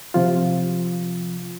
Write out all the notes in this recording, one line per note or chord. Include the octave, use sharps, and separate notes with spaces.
C3 F3 F4